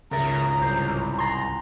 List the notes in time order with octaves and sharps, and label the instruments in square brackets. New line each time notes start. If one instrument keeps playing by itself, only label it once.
[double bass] G#1 C#2 [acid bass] C#3 [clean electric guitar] A4 A#4 E5 [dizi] A#5
[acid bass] C2 [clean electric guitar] C5
[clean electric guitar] A#5 C6